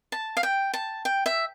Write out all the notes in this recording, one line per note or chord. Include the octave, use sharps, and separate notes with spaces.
A5
F5
G5
A5
G5
E5